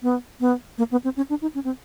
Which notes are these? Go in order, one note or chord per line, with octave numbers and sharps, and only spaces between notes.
B3
B3
A#3
B3
C4
C#4
D4
D#4
C#4
C4